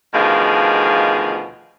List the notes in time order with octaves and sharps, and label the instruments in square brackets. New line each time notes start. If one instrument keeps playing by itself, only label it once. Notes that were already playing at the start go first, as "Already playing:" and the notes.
[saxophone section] D2 B2 D#3 F3 G#4 F5